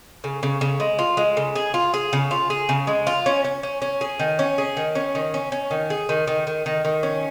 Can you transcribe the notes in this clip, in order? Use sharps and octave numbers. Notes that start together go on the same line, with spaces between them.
C#3
C#3
C#3
G#3
F4
G#3
C#3
G#4
F4
G#4
C#3
F4
G#4
C#3
G#3
F4
C#4
C#4
C#4
C#4
G#4
D#3
C#4
G#4
D#3
C#4
D#3
C#4
C#4
D#3
G#4
D#3
D#3
D#3
D#3
D#3
C#4